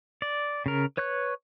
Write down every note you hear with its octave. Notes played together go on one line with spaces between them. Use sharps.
D5
C#3 A#4
B4 C#5 C#6 F#6